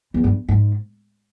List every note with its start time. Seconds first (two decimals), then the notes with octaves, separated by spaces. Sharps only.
0.14 E2
0.24 G2
0.48 G#2